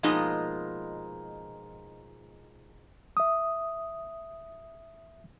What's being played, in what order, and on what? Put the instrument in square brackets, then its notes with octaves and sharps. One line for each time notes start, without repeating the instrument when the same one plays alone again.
[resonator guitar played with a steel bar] B2 F3 G#3 A#3 D#4
[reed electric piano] E5 D#6